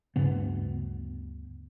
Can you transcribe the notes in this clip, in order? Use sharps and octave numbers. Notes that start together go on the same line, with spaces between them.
D2 G2 C#3 B3